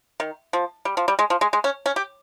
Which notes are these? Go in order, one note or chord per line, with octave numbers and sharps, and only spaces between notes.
D#3
F3
G3
F3
G3
G#3
F3
G#3
G#3
C#4
C#4
G4